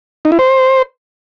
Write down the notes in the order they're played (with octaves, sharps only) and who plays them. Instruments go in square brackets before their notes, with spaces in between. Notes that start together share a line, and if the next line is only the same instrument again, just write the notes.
[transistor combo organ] D#4
E4
C5